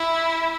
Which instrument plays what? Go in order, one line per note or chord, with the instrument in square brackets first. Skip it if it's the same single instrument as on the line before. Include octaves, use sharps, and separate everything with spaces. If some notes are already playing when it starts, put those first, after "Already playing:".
Already playing: [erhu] E4